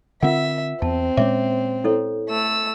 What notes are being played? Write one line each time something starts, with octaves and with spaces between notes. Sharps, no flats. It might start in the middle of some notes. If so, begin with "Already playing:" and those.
D3 C4 F4 A#4 E5 F#5
E2 C4 A5
A#2 G#3 C#4 C#5 E5 D6
E4 A4 C#5
A3 E6